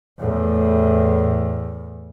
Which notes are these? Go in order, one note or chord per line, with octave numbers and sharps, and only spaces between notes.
E2 A2